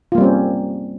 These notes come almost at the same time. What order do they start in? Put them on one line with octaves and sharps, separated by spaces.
F4 A#3 G3 C4 C#4